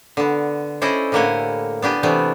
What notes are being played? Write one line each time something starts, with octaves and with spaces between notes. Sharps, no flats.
D3 B3
C#4 E4 A4 C5 D5 D#5
A2 D3 A#3 G4 F#5 G#5
B3 D4 G4 G#5
C3 E3 A3 B3 D4